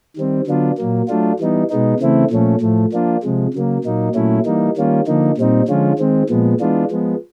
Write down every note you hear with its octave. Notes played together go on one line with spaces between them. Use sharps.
D#3 G3 C4
D3 F#3 B3 D4 F4
A#2 F#3 A#3
F#3 A3 D4 F4
E3 G3 B3 D#4
B2 G#3 B3 D#4
C#3 E3 A3 C4 E4
A#2 F3 A3 C#4
A2 F3 A3
F3 A#3 D4 F4
C3 F3 G#3
C#3 F#3 A#3
A#2 F#3 A#3 D#4
A#2 F#3 A3 C#4 E4
E3 G3 A#3 D#4
D#3 G3 A#3 C#4 F4
D3 F3 A#3 D#4
A#2 G3 C4 D#4
D3 F3 G#3 C#4 F4
D#3 G#3 C4
A#2 F3 G#3 B3
E3 G#3 B3 D4 F4
F3 G#3 B3